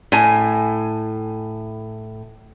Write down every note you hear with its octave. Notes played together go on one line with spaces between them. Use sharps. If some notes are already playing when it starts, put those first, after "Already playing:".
A2 G#5